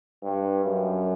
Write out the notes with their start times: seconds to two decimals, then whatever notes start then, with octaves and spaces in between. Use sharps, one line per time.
0.23 G2
0.64 F#2